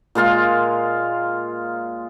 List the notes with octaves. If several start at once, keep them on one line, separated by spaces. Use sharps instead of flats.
A#2 G#3 F4 F5